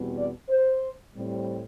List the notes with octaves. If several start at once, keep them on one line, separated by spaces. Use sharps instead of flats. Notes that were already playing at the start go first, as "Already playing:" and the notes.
Already playing: E2 B2 G3 C4
D5
C5
A2 G3 C4